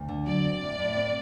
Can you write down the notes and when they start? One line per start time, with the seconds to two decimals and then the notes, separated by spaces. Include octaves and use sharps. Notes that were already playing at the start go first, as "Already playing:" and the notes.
Already playing: D2
0.08 D3
0.26 F#3 D5
0.44 C4
0.62 A2
0.79 A2
0.97 C4